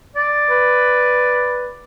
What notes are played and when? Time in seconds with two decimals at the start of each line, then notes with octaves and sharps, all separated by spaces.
0.16 D5
0.50 B4